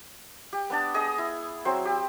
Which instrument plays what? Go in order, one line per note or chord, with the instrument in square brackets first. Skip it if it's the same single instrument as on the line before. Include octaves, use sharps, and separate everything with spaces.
[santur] G4
B3 D4 A5
G#4 D#5
E4
F#3 C4 C5
G4